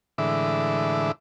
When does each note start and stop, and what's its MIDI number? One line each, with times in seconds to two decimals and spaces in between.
0.18 1.12 45
0.18 1.12 50
0.18 1.12 52
0.18 1.12 56
0.18 1.12 76
0.18 1.12 86